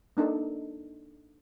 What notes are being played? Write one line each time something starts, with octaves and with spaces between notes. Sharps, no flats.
A#3 D4 D#4 A4